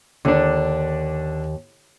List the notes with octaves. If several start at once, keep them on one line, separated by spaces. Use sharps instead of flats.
D#2 D3 D4